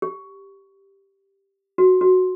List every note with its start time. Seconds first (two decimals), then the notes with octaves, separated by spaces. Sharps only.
0.02 G4
1.78 F#4
2.01 F#4